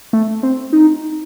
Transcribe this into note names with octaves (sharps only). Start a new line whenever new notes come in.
A3
C4
D#4